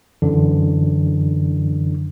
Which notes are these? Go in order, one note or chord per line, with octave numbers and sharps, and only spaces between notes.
F#2 D3 E3 D4